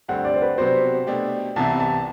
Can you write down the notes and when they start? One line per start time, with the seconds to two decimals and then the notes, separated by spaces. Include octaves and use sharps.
0.08 G2 D3 A3 C4 G4 F#5
0.25 D5
0.36 C5
0.42 B4
0.58 C3 F#3 B3 D4 F#4 C5
1.07 B2 A3 D4 G4
1.56 C2 C3 E3 B3 E4 A5
1.80 A5